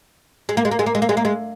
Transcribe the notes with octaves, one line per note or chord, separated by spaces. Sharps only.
G#3
A#3
G#3
A#3
G#3
A#3
G#3
A#3
G#3
A#3
G#3